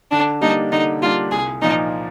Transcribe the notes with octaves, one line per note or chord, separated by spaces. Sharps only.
D3 D4
G3 A#3 D4 D#4
D3 D#4
G3 A#3 D4 F4
C2 G#4
A#2 F3 A#3 D#4